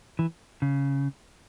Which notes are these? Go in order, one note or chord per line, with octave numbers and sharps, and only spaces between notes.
E3
C#3